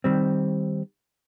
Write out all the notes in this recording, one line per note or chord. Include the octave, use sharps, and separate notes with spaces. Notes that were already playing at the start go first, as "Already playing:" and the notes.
D#3 G3 C4